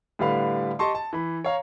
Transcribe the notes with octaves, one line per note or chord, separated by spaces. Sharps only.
A2 D3 G3 B4 F5 B5
G4 D#5 A5 C6 C#6
A5
E3 B5
C#5 F5 A#5